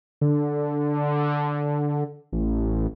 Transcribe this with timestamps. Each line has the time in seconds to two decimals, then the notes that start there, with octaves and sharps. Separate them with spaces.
0.21 D3
2.32 A1